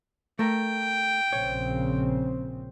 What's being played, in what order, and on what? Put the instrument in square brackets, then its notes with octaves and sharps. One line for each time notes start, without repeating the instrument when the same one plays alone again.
[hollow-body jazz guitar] A3 A#4 [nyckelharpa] G5
[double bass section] A#1 C#3 C4 [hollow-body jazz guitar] C#5